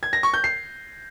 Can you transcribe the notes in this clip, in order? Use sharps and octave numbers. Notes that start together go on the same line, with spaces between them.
G#6
A#6
C#6
G6
C7